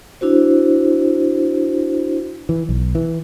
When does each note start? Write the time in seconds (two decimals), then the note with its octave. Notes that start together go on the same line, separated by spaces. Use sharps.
0.21 D4 E4 F#4 C5
2.49 E3
2.69 B1
2.95 E3